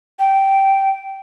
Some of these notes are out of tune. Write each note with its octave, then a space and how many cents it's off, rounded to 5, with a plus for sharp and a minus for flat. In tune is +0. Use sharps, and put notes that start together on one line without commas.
G5 -10